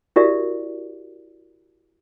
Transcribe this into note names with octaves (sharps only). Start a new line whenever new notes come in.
E4 F#4 G4 A#4 D5 E5